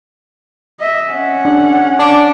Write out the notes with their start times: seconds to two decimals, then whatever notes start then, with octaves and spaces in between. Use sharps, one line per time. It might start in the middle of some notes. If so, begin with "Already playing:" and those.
0.80 D#5 E5
1.10 C#4 F#5
1.45 D4
1.99 D4 D6